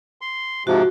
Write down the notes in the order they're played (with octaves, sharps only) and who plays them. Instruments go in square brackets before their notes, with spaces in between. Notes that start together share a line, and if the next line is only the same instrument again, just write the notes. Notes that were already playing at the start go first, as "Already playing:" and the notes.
[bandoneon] C6
[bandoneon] G#2 C3 F3 [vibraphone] F#4